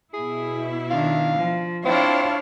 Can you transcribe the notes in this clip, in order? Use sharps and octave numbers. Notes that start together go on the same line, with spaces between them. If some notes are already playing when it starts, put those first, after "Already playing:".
B2 E4 G#4
D#3 D4 F5
F3
C4 D4 E4 F4 C#5 F5